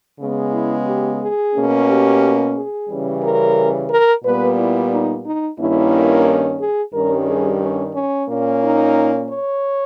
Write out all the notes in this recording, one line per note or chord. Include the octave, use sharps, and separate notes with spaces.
C#3 G#3 B3
E4
G4
G#4
B2 A#3 C#4
G4
G#4
C#3 E3 G3 C#4
A#4
A#4
A#2 G3 B3 B4
E4
D#4
D#4
G2 D#3 A#3 C#4 E4
G#4
G2 D#3 G3 C#4 A#4
G#4
C#4
C#4
A#2 A#3 C#4
D#4
C#5